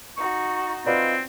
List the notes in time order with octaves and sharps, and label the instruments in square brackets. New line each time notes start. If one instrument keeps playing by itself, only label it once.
[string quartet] D#4 F#4 [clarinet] C#6
[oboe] C4 [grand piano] F4 B4 D5 [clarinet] D#5